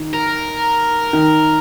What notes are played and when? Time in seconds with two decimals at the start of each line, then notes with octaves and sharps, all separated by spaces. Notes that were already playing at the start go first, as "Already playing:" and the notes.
Already playing: D#3
0.13 A#4
1.13 D#3